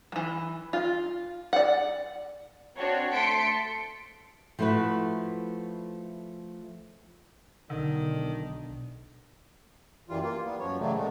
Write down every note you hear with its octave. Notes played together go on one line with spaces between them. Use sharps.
E3 F#3
F4
D5 F#5
C4 D4 F#4 C5 C#5
A3 A5 C6 B6 C#7 D7
F3 A3 E4 F#4 B4
B1 D3 D#3 D4
F#2 E3 G3 F4
A#3 F4
G3 B3
F#2 F3 C#5
A2 C#3 E3 F#3 G3 A3
A#2 G#3 A3